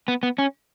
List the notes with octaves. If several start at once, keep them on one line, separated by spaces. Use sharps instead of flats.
B3
B3
C#4